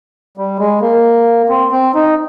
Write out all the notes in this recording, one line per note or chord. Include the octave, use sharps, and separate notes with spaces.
G3
G#3
A#3
C4
C4
D#4